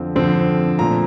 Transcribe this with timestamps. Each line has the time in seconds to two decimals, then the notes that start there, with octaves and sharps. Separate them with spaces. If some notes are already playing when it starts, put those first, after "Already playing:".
Already playing: F2 D3 F3 C4
0.15 F2 D3 F3 C4
0.79 A#2 F3 A3 C4 A#5